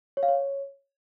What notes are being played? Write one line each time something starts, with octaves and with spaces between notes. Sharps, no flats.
C#5
F5
C#5